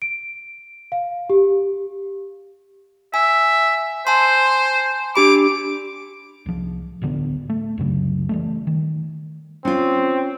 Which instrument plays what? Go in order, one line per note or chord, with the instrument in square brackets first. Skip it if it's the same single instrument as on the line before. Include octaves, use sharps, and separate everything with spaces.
[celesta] D7
F5
G4
[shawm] E5 [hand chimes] G#5
[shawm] C5 [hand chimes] G#5 A5 C6
[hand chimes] D4 G4 B5 [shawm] D6
[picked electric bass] C2 F3
D1 A1 D3 B3
A3
C2 F#2 C#3 F#3
E3 G3 A3
D#3
[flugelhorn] C4 [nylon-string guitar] C#4 F4